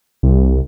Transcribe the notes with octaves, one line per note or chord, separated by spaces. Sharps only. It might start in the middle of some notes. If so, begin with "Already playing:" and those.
C2